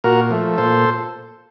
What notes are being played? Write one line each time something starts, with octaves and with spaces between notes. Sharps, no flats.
A#2 F#4 A#4
F3 A3
A#2 A4 C5